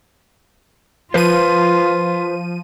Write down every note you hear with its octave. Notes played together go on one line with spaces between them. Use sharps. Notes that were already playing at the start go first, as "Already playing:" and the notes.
F3 F4 B4 C5 D#7